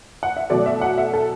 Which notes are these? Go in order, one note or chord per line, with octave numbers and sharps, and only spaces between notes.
F#5
E5
B2 F#3 A3 D5
E5
F#5
E5
A4